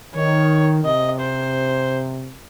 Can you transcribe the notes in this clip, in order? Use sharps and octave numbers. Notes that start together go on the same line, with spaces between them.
D#3 C#5
C3 D#5
C5